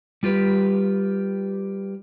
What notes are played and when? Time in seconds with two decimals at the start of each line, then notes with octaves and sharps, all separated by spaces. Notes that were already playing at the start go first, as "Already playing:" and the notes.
0.23 G3 F4 G4 B4